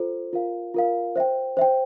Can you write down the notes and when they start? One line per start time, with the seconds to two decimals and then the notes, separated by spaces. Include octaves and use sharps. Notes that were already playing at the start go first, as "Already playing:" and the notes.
Already playing: F4 A4 C5
0.33 F4 A#4 F5
0.74 F4 A#4 F5
1.16 C5 E5 G5
1.57 C5 E5 G5